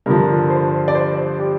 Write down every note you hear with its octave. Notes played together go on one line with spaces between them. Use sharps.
G2 D3 F3 A#4
C5
D5
C5
G4